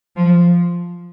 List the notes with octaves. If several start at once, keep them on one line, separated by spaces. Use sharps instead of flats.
F3